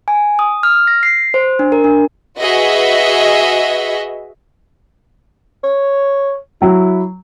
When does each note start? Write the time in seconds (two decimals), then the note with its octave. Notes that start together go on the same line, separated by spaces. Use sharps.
0.08 G#5
0.39 D#6
0.63 F6
0.87 A#6
1.03 C7
1.34 C5
1.59 D4
1.72 A#4
1.84 D4
2.40 F#4 G#4 B4 D#5 E5
5.64 C#5
6.62 F#3 E4